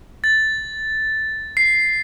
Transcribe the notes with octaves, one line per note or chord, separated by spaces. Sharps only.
A6
C7